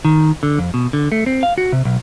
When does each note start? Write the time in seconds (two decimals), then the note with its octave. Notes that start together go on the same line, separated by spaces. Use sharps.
0.05 D#3
0.43 D3
0.58 F2
0.74 B2
0.93 D3
1.12 A3
1.26 C4
1.43 F5
1.58 F#4
1.72 C3
1.85 B1